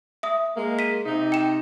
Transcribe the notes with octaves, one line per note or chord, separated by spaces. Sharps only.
E5 D#6
G#3 A#3
B6 D#7
C3 D#4
G5 E7